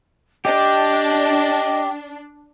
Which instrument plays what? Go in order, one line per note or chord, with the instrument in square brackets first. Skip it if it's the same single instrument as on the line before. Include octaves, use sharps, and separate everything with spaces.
[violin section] D4 [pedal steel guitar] G4 [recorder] D#5